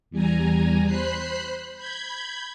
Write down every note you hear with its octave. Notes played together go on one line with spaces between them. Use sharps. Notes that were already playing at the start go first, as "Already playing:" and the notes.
E2 G3 G#5 A#5
C5 B5 F#6 C7
B5 G6 G#6